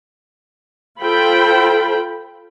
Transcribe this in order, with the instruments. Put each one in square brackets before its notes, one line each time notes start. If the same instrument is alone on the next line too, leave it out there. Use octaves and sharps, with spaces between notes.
[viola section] F4 A4 C5 G5 B5